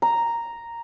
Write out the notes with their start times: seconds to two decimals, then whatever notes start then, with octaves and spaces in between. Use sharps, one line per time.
0.02 A#5